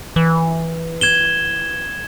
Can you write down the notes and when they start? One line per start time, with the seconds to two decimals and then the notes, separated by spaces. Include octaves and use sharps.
0.16 E3
1.01 G#6 E7 G7